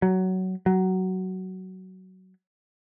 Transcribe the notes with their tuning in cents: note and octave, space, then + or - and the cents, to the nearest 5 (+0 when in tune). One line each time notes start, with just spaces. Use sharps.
F#3 +15
F#3 +15